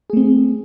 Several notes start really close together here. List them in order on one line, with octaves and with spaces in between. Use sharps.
G#4 A3 C4